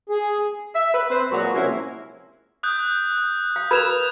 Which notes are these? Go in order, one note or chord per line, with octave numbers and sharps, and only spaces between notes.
G#4
E5
B4
C4 B4 C5
A#2 F#3 G#3 F#4
C3 F3 G#3 A#3 C#4 E4
D#6 F#6 G6
F5
A#4 B4 B5 G#6 E7 F7